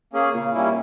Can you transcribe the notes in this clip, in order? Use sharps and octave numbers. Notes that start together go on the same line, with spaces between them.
A#3 C#4 G#4
A#2 C#3
G3 A#3 C#4 E4